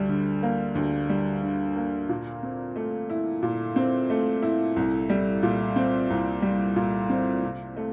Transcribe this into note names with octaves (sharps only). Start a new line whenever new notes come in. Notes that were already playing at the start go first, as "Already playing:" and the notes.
Already playing: D2 G3
D3
A#3
D2
G3
D3
A#3
A#2
C4
A3
E4
A#2
C4
A3
E4
C2
G3
A#2
C4
C2
G3
A#2
C4
C3
A3